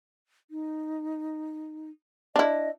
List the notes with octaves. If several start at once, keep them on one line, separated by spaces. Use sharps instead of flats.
D#4
D4 E4 D#5